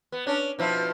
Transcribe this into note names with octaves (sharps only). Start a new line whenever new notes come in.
B3
C#4 D4
B2 F3 E4